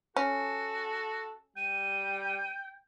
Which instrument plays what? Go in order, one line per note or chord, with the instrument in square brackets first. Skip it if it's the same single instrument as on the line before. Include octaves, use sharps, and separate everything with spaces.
[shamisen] C#4 [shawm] F#4 [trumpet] A4
[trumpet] G3 [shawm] G5 [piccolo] D#7